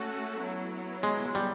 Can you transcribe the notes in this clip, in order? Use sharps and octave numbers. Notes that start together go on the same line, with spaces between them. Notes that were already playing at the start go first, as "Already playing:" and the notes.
Already playing: A3 C#4 F#4 A4
F#3 B3 E4
G#3
G3